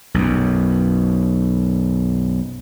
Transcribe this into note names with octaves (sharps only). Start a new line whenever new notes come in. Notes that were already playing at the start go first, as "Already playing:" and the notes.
B1 F#2